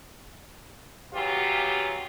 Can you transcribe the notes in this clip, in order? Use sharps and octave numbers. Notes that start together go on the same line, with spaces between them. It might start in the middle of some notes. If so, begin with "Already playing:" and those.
C#3 E3 F#3 F4 G4